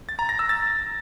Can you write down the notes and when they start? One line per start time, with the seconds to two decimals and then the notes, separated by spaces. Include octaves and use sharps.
0.09 A6
0.19 A#5
0.29 A#6
0.39 E6
0.49 A6